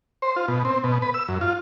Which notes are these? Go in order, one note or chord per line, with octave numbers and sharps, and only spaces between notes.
C5
F4
B2
C4
B2
B4
E6
F#2
F4